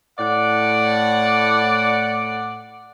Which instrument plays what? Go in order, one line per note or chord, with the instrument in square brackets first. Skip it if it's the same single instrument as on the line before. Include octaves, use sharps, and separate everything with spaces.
[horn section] A2 D5 F#5